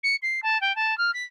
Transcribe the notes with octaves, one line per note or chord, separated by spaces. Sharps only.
C#7
C7
A5
G5
A5
F6
B6